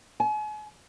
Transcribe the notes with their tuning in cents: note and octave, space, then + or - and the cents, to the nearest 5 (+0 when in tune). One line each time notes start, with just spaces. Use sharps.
G#5 +40